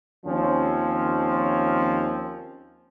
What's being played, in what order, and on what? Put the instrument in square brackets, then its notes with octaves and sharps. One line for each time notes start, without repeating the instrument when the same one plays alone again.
[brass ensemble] D#2 F3 C4 C#4